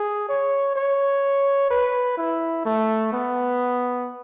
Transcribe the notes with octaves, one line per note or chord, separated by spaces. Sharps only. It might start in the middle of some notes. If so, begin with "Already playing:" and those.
Already playing: G#4
C#5
C#5
B4
E4
A3
B3